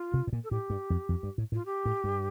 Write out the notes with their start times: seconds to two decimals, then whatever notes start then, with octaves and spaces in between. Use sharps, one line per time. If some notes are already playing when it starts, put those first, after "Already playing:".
Already playing: F4
0.14 C3
0.27 A2
0.33 A#2
0.44 A4
0.51 A2 G4
0.70 G2
0.90 F2
1.09 F2
1.23 G2
1.38 A2
1.52 A2 F4
1.66 G4
1.85 A2
2.04 G2